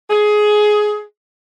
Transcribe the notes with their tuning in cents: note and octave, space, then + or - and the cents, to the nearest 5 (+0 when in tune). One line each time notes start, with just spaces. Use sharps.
G#4 +15